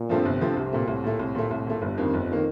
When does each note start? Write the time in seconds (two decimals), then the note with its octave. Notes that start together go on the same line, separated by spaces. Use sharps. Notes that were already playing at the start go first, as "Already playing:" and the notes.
Already playing: A#2
0.09 G2 F3 A3 C4
0.25 G1 C3
0.41 G2 F3 A3 C4
0.56 C2 C3
0.73 A#2 A3
0.87 C2 A2
1.04 A#2 A3
1.19 C2
1.35 A#2 A3
1.51 C2
1.67 A#2 A3
1.82 G1 G2
1.98 F2 D#3 A#3
2.13 G1 F2
2.31 D#3 A#3